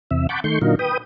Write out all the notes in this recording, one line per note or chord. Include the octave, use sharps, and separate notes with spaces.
E2 C3 E5
F#5 A5 B5 C#6 D6 G6
D#3 A3 C6 C#6 G6
A#2 D3 F#3 D#4 F4 A#4
B4 G5 D#6